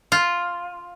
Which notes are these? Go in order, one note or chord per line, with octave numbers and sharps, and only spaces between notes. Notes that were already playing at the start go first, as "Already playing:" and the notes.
F4